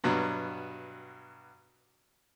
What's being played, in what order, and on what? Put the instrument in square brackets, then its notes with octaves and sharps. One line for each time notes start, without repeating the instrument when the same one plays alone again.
[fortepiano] G2 B2 F#3